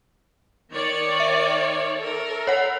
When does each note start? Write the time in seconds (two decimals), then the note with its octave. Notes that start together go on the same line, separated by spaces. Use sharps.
0.73 D#3 C#5 D5
1.20 E5
1.98 A4 A#4
2.47 C#5 F#5